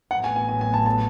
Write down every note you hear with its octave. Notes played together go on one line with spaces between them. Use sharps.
A1 A2 F#3 B3 F#5
G#5
G#5
G#5
G#5
A5
A5